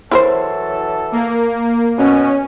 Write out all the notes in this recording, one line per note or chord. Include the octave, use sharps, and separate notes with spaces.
E3 F#3 E4 A4 A#4 C5
A#3
B2 C#4